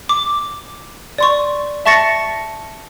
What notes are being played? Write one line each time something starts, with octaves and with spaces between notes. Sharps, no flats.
D6
D5 C6 C#6
E5 A5 C#6 A6 A#6 C#7